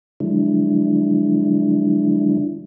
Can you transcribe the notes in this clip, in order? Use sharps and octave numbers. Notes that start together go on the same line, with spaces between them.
D3 F3 F#3 G#3 D4 E4